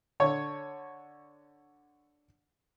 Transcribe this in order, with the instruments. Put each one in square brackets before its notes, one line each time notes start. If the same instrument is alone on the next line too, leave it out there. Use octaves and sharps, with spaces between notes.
[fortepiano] D3 C#5 C#6